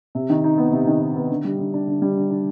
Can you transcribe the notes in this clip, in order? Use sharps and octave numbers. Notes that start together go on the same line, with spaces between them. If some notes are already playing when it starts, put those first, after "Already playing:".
C3
D#3
D#4
B3
C3
D#3
D#4
B3
D3
G3
D3
D4
D3
G3
D3
D4